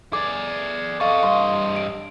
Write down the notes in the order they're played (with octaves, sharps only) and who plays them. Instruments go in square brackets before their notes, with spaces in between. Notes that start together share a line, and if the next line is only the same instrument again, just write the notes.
[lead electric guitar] G#4 D5 [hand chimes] D6
[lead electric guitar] A4 D#5 [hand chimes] F5 C#6
[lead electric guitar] G2 D#5 [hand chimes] C6
[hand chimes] D7